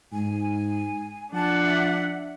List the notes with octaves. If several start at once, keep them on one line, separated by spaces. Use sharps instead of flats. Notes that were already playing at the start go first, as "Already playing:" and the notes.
G#2 G#5
F3 D4 F#5 A5
E5